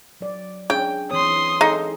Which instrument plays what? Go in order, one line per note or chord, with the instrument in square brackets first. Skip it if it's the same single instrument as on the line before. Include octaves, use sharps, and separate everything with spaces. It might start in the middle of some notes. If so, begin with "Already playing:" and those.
[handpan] F#3 D5
[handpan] C#4 D4 G#4 [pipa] G5
[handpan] E3 C4 C#5 [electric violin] C6 D#6
[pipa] D#4 [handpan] G#4 A4